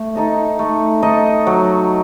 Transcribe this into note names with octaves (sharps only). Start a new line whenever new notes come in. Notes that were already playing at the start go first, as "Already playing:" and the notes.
Already playing: A3
D#4 A4 D#5
A3
D#4 A4 D#5
F#3